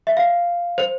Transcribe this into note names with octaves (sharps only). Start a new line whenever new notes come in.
E5
F5
C5